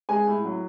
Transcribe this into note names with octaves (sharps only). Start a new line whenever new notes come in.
G#3 G#5
A2
F#3